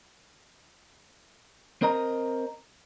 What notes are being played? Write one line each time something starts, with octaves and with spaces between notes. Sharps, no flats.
C4 A#4 D#5 A#5